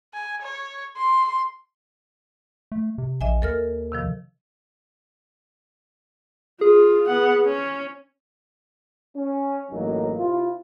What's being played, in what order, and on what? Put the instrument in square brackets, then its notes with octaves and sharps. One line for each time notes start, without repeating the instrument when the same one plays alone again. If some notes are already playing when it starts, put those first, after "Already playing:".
[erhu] G#5
C#5
C6
[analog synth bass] A3
C3
[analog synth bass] A#1 [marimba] D#5 E5 G#5
[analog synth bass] D#2 [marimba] A4 A#4 F6
[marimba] C3 D#3 F3
[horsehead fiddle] F4 [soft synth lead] G#4
[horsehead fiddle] B3 F#5
C#4
[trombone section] C#4
A1 F#2 F#3 A#3 D#4
C3 E4 F4